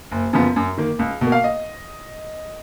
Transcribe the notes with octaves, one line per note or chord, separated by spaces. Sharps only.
F#1
F#2 C#3 F3 B3
F#2
D#3 A#3
C#2
B2 A#3
F5
D#5